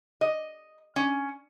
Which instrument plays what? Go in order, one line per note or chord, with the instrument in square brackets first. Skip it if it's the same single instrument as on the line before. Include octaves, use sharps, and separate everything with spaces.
[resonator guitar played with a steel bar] D#5
C#4